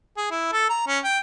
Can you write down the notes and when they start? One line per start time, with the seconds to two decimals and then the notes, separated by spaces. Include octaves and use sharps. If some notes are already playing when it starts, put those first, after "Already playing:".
0.17 G#4
0.31 E4
0.53 A4
0.70 A#5
0.87 C#4
1.04 G5